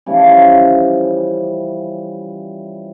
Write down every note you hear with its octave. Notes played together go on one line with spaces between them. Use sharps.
C#3 E3 F3 G3